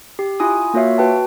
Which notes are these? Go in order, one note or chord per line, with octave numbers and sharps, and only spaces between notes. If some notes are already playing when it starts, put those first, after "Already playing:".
G4
E4 F4 G#5 D#6
A#3 F4 F#4 C#5 E5 F5
F#4 B4 G5 A5